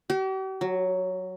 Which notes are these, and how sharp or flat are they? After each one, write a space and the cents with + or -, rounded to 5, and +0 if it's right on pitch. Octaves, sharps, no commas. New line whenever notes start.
G4 -45
F#3 +0